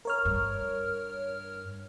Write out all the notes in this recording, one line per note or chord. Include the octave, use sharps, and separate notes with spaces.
A#4 C#5 F6
G2